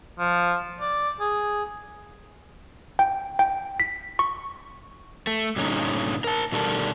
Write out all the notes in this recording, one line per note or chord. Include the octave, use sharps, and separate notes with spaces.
F3
D5
G#4
G5
G5
B6
C#6
A3
G2 A#2 D3 C#4 D#4
A#4 A5
B2 D#3 G3 D4 A4 A#4